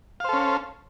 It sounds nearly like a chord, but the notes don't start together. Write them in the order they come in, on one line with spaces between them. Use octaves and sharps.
F5 C5 A4 C#4